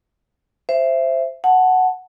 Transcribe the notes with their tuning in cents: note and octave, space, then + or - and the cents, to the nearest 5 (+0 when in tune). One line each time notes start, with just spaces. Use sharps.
C5 +0 E5 +15
F#5 +0 A5 -5